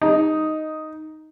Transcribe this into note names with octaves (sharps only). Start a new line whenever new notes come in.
D#4